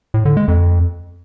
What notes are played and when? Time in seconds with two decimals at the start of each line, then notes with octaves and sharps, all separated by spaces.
0.14 A2
0.25 D3
0.37 G#3
0.48 F2